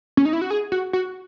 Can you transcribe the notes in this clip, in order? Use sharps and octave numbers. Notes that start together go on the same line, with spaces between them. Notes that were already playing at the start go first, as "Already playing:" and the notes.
C#4
D#4
E4
F#4
G#4
F#4
F#4